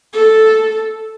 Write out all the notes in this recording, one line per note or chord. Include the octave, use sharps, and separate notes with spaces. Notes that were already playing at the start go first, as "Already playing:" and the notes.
A4